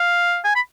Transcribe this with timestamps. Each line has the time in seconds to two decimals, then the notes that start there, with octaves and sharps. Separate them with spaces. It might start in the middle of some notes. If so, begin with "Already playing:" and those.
Already playing: F5
0.44 G#5
0.55 B5